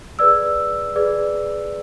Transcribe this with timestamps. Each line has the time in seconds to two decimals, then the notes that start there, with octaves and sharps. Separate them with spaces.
0.19 G#4 B4 D5 E6
0.96 G#4 B4 D5